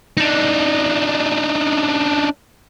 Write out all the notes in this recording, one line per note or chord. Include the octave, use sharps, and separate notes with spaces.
D4 D#4